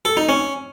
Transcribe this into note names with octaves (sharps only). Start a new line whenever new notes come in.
A4
D#4
C#4